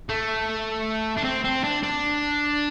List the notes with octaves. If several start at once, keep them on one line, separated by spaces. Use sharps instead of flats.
A3
D4
C4
C4
D4
D4